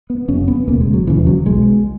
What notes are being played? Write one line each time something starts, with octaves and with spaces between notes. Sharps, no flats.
B3
F#1 F#2 C#3 C#4
B3
E1 D#2 C#3 A#3
G#3
F#3
E1 D#2 C#3 E3
F#3
B1 B2 G#3